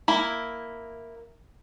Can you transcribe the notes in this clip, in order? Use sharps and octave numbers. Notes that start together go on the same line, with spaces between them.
A#3 E4